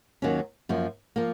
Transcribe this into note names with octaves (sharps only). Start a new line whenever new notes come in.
D#2 D#3 F#3 C#4
F#2 F3 A#3
F3 A#3